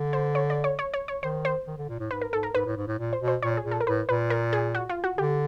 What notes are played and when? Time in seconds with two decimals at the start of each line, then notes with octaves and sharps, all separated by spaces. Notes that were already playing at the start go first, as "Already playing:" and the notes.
Already playing: D3
0.13 C5
0.35 C#5
0.50 D5
0.64 C#5
0.79 C#5
0.94 C#5
1.08 C#5
1.23 D#3 C5
1.45 C5
1.67 D#3
1.77 D3
1.89 A#2
1.99 A2
2.11 G#2 B4
2.22 A#4
2.32 G#2 A4
2.43 A#4
2.55 G#2 B4
2.66 A2
2.76 G#2
2.87 A2
2.98 A#2
3.13 C5
3.21 B2
3.28 C5
3.42 A#2 C#5
3.57 G#4
3.64 A#2
3.71 A4
3.80 A#4
3.86 A2 B4
4.08 A#2 B4
4.30 A#4
4.53 G#4
4.75 F#4
4.89 F4
5.04 F#4
5.18 D3 G4